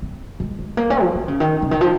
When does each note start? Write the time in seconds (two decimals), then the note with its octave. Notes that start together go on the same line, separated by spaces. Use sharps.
0.02 C4
0.40 G#3
0.59 G#3
0.77 A#3
0.90 C#4
1.02 F3
1.15 D#3
1.28 C#3
1.40 D#3
1.62 C#3
1.71 D#3
1.81 F3